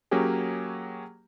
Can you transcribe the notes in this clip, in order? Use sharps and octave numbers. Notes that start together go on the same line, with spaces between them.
F#3 A#3 C#4 G4 G#4